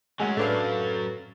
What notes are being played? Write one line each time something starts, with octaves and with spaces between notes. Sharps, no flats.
F#3 G#3 A3 C#4 F#5 G#5
A2 A3 D4 A4 B4 F5